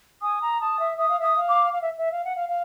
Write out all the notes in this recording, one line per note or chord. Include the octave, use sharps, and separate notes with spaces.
G#5 D#6
A#5
A5 D#6
E5
E5 D#6
F5
E5 D#6
F5
D6
F5
E5
E5
F5
F#5
F5
F5